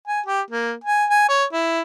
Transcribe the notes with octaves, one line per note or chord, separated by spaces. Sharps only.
G#5
G4
A#3
G#5
G#5
C#5
E4